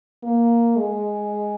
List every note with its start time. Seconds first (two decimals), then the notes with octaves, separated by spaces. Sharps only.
0.23 A#3
0.76 G#3